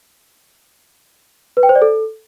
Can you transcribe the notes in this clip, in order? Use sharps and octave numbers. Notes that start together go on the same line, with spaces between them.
B4
G5
C5
D5
A4